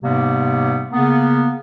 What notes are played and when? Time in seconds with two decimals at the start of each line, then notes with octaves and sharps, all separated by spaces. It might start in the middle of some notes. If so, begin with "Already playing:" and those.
0.02 G#2 C3 G3 A#3 B3
0.92 C#3 A#3 B3